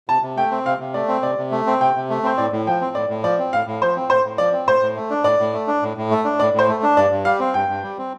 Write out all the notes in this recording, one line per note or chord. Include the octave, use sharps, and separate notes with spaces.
C3 A5
C3
A3 G5
C4
C3 F5
C3
A3 D5
C4
C3 D5
C3
A3
C4
C3 G5
C3
A3
C4 C5
A2 D5
A2
F3 G5
C4
A2 D5
A2
F3 D5
C4
A2 F5
A2
F3 C5
C4
A2 C5
A2
F3 D5
C4
A2 C5
A2
A3
D4
A2 D5
A2
A3
D4
A2
A2
A3
D4
A2 D5
A2
C5
A3
D4
G2 D5
G2
G3 F5
C4
G2 G5
G2
G3
C4